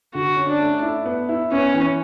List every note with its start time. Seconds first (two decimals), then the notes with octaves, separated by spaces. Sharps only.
0.14 D3 F#4
0.37 C#4
0.49 D4
0.61 A3
0.82 E4
1.06 B3
1.29 E4
1.52 B3 C#4
1.74 E3